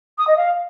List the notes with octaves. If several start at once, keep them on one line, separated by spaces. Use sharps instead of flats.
D#6
D#5
F5